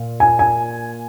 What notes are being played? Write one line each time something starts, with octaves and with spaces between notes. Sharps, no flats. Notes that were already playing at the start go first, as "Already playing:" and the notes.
Already playing: A#2
G#5
G#5